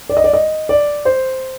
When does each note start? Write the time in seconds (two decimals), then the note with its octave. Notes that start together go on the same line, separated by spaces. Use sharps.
0.09 D5
0.17 D#5
0.24 D5
0.33 D#5
0.69 D5
1.05 C5